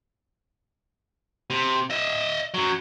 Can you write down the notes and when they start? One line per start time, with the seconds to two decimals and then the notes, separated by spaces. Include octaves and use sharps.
1.50 C3
1.90 D#5 E5
2.54 F#2 F#3